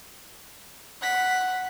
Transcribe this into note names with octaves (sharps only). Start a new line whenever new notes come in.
F#5 B6